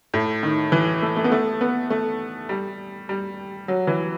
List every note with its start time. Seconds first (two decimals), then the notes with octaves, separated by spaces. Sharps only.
0.14 A2
0.43 D#3
0.72 E3
1.02 A3
1.17 A3
1.24 B3
1.32 A3
1.61 B3
1.90 A3
2.49 G3
3.09 G3
3.68 F#3
3.87 E3